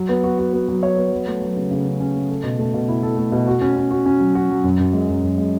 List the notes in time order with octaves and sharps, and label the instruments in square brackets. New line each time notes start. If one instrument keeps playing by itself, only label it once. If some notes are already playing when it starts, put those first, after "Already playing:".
Already playing: [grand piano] F#3
B3
F#4
F#4
B3
F#3
C#5
B3
F#3
A3
F#3
C#3
C#3
C#4
C#4
A3
A4
B2
A3
B2
E4
A4
A3
B2
F#4
C#4
C#4
F#4
C#4
F#3
F#4
F#3
F#2
F#2
G#3
F#2
F#2
G#3